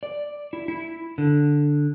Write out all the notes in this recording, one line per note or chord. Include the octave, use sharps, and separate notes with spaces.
D5
E4
E4
D3